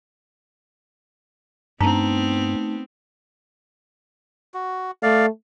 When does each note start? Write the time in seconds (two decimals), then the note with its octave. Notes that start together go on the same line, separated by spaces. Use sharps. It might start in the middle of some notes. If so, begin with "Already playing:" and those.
1.81 G2 A3 B3 C4 D4 D#4 A5 A#5
4.54 F#4
5.03 A3 D5 F5